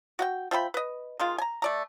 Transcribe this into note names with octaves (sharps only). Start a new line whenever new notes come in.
F#4 F#5 G5
F3 E5 G5 B5
B4 D#5
D#3 G#3 F4
G#5 A#5
A3 D5 A#5